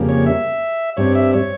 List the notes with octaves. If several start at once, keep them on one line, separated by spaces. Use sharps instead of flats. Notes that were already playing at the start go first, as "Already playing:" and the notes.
Already playing: F2 C#3 G3 A#3
C#5
E5
G2 G3 C4 C#5
E5
C#5